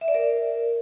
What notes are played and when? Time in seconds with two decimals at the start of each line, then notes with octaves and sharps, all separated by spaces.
0.01 E5
0.08 D5
0.15 A#4